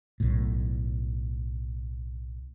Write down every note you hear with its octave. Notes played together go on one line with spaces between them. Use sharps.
B1 A2